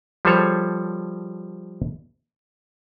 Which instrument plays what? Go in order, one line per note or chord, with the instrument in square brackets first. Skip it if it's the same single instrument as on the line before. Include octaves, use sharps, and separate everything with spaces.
[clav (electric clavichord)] F3 G3 G#4 A4 C5 C#5